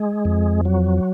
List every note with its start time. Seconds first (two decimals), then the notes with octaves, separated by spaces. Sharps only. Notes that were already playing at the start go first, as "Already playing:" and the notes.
Already playing: G#3
0.25 F2
0.65 F#3